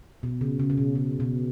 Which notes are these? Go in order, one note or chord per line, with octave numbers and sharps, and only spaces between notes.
B2
C#3
C#3
C#3
B2
C#3
B2